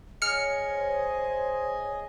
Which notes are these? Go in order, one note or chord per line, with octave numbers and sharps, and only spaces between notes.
G#4 C#5 D#5 F6 C#7
C5